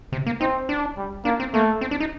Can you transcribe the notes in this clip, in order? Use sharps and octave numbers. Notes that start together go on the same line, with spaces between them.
C3
A#3
C4 D#4
D4
G3
A#3 D4
C4
A3 A#3
C4
D4
D#4